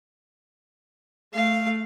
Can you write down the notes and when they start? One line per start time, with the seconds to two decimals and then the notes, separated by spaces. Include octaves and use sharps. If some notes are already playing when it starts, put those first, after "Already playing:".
1.34 A3 F5